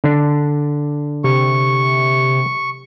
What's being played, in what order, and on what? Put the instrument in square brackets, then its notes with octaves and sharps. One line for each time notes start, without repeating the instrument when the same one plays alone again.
[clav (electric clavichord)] D3 D4
[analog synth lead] C3 [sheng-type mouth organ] C#6